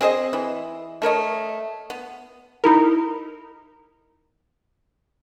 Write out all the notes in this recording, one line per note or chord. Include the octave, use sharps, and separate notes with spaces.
C4 G#4 C5 D#5
E3
A3 A#4 C#5 D#5
B3
D#4 E4 A#4